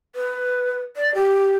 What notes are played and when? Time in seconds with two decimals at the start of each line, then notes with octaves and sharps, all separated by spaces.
0.15 B4
0.97 D5
1.15 G4